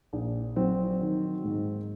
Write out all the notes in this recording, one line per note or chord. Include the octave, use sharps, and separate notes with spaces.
A#1
F#3 C4
D#3
G#2